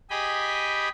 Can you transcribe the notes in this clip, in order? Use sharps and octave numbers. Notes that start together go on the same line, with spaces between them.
G4 G#4 D#5 G5 G#5 B5